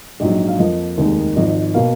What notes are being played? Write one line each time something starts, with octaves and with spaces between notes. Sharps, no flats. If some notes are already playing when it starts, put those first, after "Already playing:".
A#1 G#2 F#3 D#5
F5
F2 F3 A#3 D#5
F1 D#2 D#3 G#3 D#4
G#1 G#2 F3 D#5
B2 A#3 F5